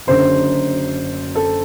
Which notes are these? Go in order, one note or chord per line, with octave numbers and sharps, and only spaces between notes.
F#1 F#2 D3 C5
A4